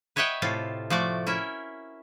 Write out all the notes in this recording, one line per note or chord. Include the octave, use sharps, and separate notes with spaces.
B4 C#5 D#5 E5 F#5 G5
A2 C3 F4 A4
F3 A3 F#4 D5
C#4 E4 A#4 E5